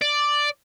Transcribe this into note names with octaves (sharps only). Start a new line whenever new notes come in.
D5